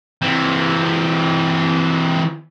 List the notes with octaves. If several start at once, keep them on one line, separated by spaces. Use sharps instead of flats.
E3 C4